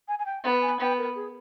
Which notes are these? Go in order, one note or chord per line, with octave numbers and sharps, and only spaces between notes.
G#5
G#5
G5
B3
G#5
B3 G5
A#4
G#4